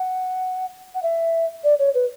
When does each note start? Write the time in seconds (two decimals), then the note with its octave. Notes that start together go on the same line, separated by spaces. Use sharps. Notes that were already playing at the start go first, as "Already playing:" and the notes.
Already playing: F#5
0.95 F#5
1.03 E5
1.64 D5
1.79 C#5
1.95 B4